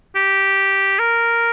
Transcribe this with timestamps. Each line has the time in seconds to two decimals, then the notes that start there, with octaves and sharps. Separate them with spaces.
0.16 G4
0.99 A#4